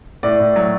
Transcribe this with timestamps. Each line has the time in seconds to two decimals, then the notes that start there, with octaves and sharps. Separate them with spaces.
0.23 A2 D5
0.40 A2
0.56 F#3